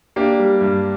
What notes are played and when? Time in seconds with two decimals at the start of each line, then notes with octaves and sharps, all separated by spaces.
0.16 A#3 D4 G4
0.39 G3
0.61 G2